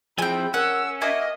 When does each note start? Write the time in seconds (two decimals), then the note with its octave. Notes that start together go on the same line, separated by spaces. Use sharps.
0.18 F3 C4 E4 G#4 G5 G#5
0.54 C#4 A#4 F#5 E6
1.02 A#3 F#4 D#5 E5 G#5